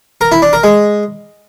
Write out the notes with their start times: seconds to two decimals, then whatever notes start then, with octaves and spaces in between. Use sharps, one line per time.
0.21 A#4
0.32 E4
0.42 D4
0.53 A#4
0.64 G#3